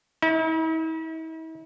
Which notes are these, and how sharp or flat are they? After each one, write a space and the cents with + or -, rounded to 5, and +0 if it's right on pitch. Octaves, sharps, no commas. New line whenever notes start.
E4 -45